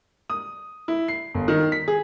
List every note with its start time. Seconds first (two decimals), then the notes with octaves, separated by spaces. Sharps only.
0.30 D#6
0.88 E4
1.08 C7
1.34 G1
1.48 D#3
1.72 B6
1.88 G#4